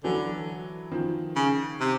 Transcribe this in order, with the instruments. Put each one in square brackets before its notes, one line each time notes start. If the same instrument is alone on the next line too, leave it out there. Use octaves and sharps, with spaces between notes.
[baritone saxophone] D3 [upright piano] E3 F#3
[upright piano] D#3 F3
[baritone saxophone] C#3
C3